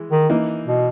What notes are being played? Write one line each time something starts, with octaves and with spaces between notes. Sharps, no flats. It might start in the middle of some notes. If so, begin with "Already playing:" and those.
Already playing: E3 G#3
D#3
E3 A#3 D#4
B2